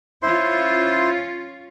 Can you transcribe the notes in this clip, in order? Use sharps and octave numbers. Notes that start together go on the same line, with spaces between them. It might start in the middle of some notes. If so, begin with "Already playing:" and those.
C#4 E4 F4 C5 C6